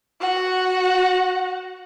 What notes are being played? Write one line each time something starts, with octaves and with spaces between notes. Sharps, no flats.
F#4 F#5